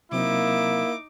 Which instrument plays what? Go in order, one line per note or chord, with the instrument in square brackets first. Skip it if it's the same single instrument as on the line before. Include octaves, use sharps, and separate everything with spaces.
[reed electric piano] C3 F#3 C4 [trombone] A#3 [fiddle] D#4 D6 [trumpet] E4